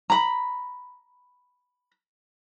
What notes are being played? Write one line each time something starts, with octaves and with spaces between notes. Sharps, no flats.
A#5 B5